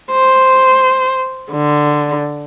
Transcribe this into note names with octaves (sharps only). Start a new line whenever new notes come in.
C5
D3